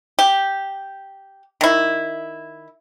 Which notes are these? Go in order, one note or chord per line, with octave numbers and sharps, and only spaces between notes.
G4
D#3 E4